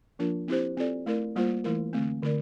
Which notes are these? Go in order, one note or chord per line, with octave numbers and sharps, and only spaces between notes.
F3 A#3 D4 F4 A#4
C4 E4 G4 C5
C4 F4 A4 D5
A3 E4 A#4 D5
G3 A#3 F4 C5
E3 A3 E4 A#4
D3 A3 C4
D3 A3 E4 A#4 D5